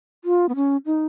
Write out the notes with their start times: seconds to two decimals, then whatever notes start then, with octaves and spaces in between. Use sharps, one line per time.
0.25 F4
0.49 B3
0.56 C#4
0.86 D#4